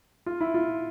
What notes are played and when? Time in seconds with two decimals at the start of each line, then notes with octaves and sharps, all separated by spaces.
0.26 F4
0.41 E4
0.54 F4